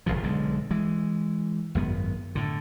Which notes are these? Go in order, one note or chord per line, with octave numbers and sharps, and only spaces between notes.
F1 C#2 C#3 F3
B1 D3 G#3
E3 G#3
G#1 F#2 B3
A2 D3